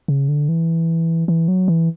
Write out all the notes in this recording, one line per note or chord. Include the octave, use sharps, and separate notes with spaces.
C#3
D3
E3
E3
F#3
E3